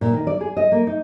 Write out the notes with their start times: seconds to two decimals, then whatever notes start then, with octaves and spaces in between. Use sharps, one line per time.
0.01 A#2
0.13 D#3
0.27 D5
0.41 G#4
0.57 D#5
0.72 A#3
0.87 D#4